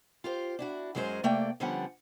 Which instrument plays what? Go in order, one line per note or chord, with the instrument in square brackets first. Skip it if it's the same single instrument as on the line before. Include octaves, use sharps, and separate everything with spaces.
[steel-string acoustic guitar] F4 G4 C5
D4 E4 F#4
F#2 F#3 G#3 C#4 E4 C5
C3 A3 A#3 D5 G5
D3 F3 G3 B3 C#4 F#5